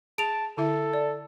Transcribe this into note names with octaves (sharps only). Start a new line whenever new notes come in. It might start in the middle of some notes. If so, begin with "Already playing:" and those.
G#4 A5 D7 F7
D3 E4 A4 E5
D5